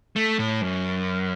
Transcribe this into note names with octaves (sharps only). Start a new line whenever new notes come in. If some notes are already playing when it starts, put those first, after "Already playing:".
A3
A2
F#2